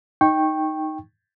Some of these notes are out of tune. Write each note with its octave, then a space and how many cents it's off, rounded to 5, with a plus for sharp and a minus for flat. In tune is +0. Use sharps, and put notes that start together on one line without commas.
D#4 +0 G5 +0 C#6 -20